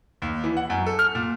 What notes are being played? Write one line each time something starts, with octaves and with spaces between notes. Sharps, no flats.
D#2
E3
F#5
F#2
A4
F6
A#2